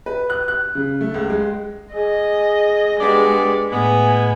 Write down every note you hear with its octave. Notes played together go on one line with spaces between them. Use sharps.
B4
F#6
F#6
C#3
A3
C#2
G#3
G#4 D#5
G2 G#3 B3 D5
A2 G#3 B3 G#5